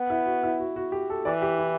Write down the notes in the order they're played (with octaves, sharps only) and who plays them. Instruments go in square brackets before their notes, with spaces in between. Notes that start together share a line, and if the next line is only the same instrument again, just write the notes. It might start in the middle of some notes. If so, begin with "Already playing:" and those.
Already playing: [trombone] B3
[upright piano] E4
F#4
E4
F#4
F#4
G4
A4
[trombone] E3 [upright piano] D5
[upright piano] G4
E4